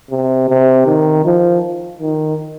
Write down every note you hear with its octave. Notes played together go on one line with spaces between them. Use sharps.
C3
C3
D#3
F3
D#3